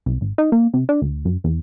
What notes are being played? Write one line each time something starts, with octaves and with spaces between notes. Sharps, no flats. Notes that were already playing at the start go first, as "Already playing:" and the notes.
C2
G#1
D#4
A#3
C3
D4
D2
F#2
E2